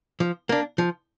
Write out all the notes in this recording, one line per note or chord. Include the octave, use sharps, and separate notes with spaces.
F3
A#3 D4
F3